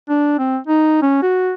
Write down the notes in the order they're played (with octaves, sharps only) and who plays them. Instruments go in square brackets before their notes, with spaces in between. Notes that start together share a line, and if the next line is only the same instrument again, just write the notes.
[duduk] D4
C4
D#4
C#4
F#4